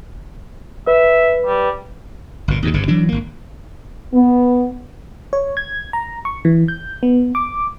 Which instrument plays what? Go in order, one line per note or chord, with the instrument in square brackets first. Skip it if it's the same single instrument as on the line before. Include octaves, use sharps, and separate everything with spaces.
[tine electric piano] B4 [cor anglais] E5
[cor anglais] G3
[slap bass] G1 A#2
D#2 G#2 C3
G1 G2 C#3
E3 F#3 D4
G#1 A#3
[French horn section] B3
[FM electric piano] C#5
G#6
A#5
C#6
E3
G6
B3
D6